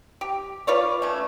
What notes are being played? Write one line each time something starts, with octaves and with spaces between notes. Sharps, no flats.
G4
F4 B4 C#5 D5
A3 C#4